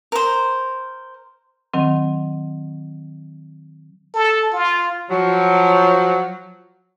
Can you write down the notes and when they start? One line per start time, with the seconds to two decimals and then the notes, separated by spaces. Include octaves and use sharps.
0.12 A#4 C5
1.74 D#3 F#3 C4
4.14 A4
4.52 F4
5.10 F3 F#3